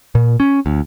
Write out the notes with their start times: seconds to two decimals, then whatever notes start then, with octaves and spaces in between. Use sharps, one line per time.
0.15 A#2
0.40 C#4
0.66 D2